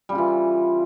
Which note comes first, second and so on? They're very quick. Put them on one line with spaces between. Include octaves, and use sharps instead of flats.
G3 C#3 F4 E3